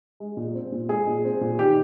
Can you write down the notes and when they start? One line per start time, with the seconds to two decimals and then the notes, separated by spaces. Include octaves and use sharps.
0.20 G#3
0.37 A#2
0.55 C4
0.72 A#2
0.89 G#3 G#4
1.07 A#2
1.25 C4
1.41 A#2
1.59 D#3 G4